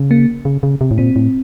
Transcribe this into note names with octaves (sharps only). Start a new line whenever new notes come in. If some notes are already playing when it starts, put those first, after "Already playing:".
Already playing: C#3
A#3
C#3
C#3
C3
A2
A#2 C4
A2